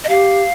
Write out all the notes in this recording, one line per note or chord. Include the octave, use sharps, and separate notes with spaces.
D#5
G4 F5